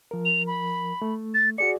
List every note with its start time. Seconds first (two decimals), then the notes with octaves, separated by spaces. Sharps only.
0.11 F3 A#4
0.25 F7
0.47 B5
1.02 A3
1.34 A6
1.58 F#4 G#4 D5 C#7